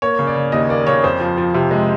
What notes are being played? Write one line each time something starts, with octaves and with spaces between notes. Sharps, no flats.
A#3 C#5
C#3
D5
C#3
D#2 D#5
A#3 D5
C#3 C#5
F2 C5
F3
F3
C3
G#3